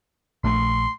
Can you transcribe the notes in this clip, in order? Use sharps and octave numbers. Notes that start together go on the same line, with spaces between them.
A#1 A3 C6